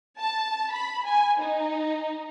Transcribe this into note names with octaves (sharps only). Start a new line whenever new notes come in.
A5
B5
G#5
D#4